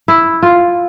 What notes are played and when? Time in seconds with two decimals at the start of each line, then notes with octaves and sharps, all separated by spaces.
0.08 E4
0.43 F4